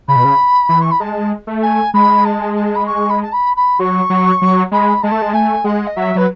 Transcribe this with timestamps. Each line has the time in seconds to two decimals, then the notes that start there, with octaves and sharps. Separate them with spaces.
0.08 C#3 B5
0.16 B2
0.25 C#3
0.69 E3
0.81 C#6
0.91 B5
1.00 G#3 A5
1.47 A3
1.62 G#5
1.94 G#3 B5
2.25 A5
2.55 A5
2.75 B5
2.86 C#6
3.09 B5
3.22 A5
3.32 B5
3.56 B5
3.79 F#3 C#6
4.10 F#3
4.42 F#3
4.72 G#3 B5
5.03 G#3 A5
5.12 A3
5.22 G#3
5.33 A3 G#5
5.64 G#3 F#5
5.87 D#5
5.96 F#3 E5
6.15 F#3 B4